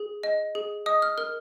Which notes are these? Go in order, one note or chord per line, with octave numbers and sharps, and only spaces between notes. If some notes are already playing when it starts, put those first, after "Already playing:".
Already playing: G#4
D#5
G#4
D#5 D#6
F6
A#4 F6